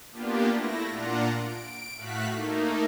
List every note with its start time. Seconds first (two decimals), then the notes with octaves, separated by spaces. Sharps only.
0.12 A#3 B3 D4 F4 G4
0.50 A3 E4 A#6
0.88 A#2 D4 F4 F#5 A#5
1.38 D7
1.95 A2 A3 F#4 F5 F#6 B6
2.32 A3 A#3 D#4